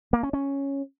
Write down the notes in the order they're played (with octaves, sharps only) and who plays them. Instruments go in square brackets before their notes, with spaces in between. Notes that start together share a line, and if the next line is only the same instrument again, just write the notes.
[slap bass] A#3
C#4
C#4